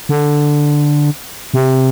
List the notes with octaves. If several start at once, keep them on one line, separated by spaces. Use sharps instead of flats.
D3
C3